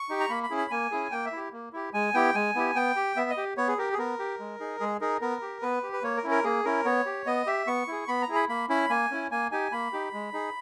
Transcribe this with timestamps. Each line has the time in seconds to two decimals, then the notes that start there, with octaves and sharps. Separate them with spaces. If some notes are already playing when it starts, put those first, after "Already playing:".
Already playing: C#6
0.09 D#4 G4
0.20 A#5
0.29 A#3 B5
0.43 B5
0.50 C#4 E4 G#4
0.57 B5
0.71 A#3 G#5
0.91 C#4 E4 G#4
1.11 A#3 G5
1.25 E5
1.32 E4 G4
1.53 A#3
1.73 E4 G4
1.94 G#3 G#5
2.14 B3 E4 G4 G5
2.35 G#3 G#5
2.55 B3 E4 G4
2.75 B3 G5
2.96 G4
3.16 B3 E5
3.30 D#5
3.37 G4
3.57 B3 C#5
3.68 G#4
3.78 G4 A#4
3.93 G#4
3.98 B3 A#4
4.19 G4
4.39 G#3
4.60 D#4 G#4
4.80 G#3 G#4
5.01 D#4 G#4 A#4
5.21 B3 A#4
5.42 G4
5.62 B3 B4
5.83 G4
5.93 B4
6.03 A#3 C#5
6.17 A#4
6.24 C#4 E4
6.31 A#4
6.44 A#3 G#4
6.65 C#4 E4 A#4
6.85 B3 C#5
7.06 G4
7.26 B3 D#5
7.47 G4 E5
7.67 B3 C#6
7.88 E4 G#4
8.08 B3 B5
8.22 A#5
8.29 E4 G#4
8.36 B5
8.49 A#3 B5
8.69 C#4 E4 B5
8.90 A#3 G#5
9.11 C#4 E4
9.31 A#3 G#5
9.52 D#4 G4 G#5
9.72 A#3 B5
9.93 D#4 G4
10.13 G#3
10.33 D#4 G#4